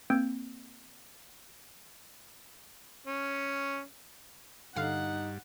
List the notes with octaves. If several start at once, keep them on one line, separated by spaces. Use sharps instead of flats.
A#3 C4 E6 G6 G#6 D7
C#4
G2 D3 D#4 F5 F#5 F6